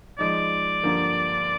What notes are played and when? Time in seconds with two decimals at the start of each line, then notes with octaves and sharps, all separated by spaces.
0.19 F3 G#3 D#4 D5
0.83 G2 D3 F3 A#3